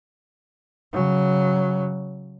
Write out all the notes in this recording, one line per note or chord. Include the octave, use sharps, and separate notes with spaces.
C#3 F#3